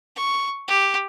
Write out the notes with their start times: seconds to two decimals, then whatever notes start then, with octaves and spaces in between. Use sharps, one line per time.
0.16 C#6
0.68 G4